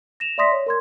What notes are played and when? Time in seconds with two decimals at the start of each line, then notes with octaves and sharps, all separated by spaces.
0.20 A#6 E7 F7
0.38 D5 E5 C6 D#6 A#6 B6
0.52 C#5
0.67 A#4 C6 G#6